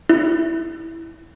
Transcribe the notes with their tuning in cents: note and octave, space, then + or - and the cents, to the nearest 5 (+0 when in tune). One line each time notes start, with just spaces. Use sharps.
E4 -5